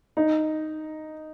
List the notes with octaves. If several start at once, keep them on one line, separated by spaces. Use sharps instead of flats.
D#4